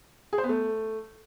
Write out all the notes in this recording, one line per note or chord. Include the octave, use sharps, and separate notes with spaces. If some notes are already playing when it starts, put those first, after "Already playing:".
G#4
C5
B3
A3